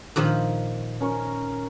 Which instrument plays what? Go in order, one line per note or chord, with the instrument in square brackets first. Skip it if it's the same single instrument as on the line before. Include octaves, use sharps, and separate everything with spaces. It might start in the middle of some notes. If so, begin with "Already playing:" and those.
[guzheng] A#2 D#3 F3
[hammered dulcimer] C#4 A#4 C#6